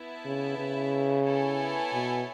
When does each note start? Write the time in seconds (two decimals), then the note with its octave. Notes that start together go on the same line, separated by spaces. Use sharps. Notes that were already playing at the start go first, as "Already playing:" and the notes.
Already playing: B3 E4 B4 E5 A5
0.25 C#3
0.58 C#3
1.25 B3 E4 A4 C#5 G#5
1.93 B2